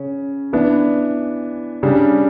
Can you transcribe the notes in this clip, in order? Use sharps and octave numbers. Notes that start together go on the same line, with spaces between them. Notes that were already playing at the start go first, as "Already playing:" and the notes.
Already playing: C#3 C#4
E3 B3 D4
C#3 G3 D4